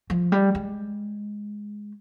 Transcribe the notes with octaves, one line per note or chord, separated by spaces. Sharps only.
F3
G3
G#3